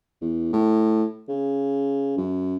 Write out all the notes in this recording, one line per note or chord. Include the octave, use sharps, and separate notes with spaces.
E2
A2
C#3
F#2